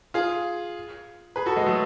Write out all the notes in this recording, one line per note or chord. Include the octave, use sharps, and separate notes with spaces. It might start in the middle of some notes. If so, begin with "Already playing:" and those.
F4 G#4
G#4 B4
F#4 A4
G#3 B3
F#3 A3